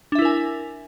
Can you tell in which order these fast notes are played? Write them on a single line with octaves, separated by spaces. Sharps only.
D4 E5 E4 A#4 G#5